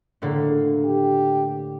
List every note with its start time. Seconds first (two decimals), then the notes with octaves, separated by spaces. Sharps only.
0.22 A2 D3 A#3
0.85 G4